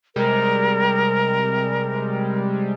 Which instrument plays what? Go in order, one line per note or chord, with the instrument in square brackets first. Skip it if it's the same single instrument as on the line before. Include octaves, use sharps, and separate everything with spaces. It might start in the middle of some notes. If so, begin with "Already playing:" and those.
[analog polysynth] C3 G3 G#3 [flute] A#4